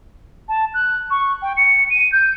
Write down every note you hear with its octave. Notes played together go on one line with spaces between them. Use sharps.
A5
F#6
C#6
G5
C#7
D#7
G6